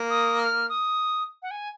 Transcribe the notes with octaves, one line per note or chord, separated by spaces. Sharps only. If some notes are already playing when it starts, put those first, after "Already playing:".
Already playing: A#3
D#6
F6
D#6
F#5
G#5